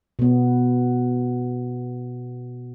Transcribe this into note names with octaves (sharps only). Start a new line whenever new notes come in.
B2 B3